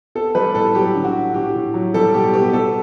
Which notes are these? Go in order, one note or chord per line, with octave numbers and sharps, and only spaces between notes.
B3 A4
G3 B4
A2 A4
F#3 G4
D3
F#4
D3
A2 G4
A2
F#3
G3 A4
B2 G4
B3 G4
B3 A4